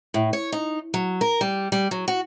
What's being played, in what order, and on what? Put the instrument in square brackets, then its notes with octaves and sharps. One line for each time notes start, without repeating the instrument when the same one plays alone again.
[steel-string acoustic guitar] A2
C#5
D#4
F#3
A#4
G3
G3
F#3
F#4